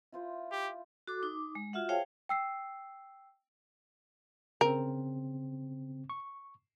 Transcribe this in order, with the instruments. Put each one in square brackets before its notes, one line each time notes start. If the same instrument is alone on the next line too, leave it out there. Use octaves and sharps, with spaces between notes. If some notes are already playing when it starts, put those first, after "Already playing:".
[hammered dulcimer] E4 F4 C5
[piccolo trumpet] G4
[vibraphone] F#4 A4 D6
D#4 D6
G#3
F4 F#4 E5 F#5
G#4 C5 C#5 F5 G5 A5
[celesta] G5 E6 C7
[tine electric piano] C#3 C4 [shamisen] A#4
[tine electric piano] C#6